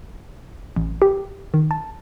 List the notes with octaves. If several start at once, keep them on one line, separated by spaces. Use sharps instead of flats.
A1
G4
D#3
A5